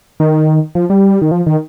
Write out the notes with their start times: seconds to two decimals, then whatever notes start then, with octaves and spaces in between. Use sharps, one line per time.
0.20 D#3
0.75 F3
0.90 G3
1.22 D#3
1.31 F3
1.46 D#3